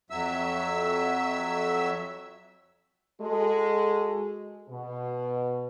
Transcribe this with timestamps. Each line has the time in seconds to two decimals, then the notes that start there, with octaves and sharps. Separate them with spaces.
0.10 F2 F#3 E5 E6
3.21 G#3 F#4 A4
4.69 B2